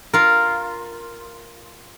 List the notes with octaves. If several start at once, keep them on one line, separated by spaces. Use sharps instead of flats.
F4 A#4